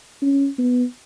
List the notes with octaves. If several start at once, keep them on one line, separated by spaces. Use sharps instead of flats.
C#4
B3